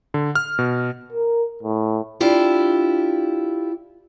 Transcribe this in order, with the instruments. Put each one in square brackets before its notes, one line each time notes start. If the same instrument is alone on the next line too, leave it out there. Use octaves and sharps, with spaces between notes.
[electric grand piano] D3
F6
B2
[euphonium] A#4
A2
[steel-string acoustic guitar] D4 E4 F4 G4